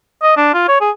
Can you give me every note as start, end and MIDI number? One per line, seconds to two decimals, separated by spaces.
0.23 0.37 75
0.37 0.52 62
0.54 0.68 65
0.68 0.78 73
0.81 0.91 68